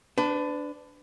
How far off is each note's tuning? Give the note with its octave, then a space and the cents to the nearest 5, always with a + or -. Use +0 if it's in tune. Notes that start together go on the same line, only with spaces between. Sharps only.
D4 +0 B4 +35